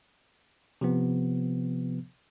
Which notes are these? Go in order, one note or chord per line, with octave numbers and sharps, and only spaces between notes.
C3 F3 B3